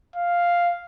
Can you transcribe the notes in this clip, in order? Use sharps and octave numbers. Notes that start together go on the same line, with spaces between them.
F5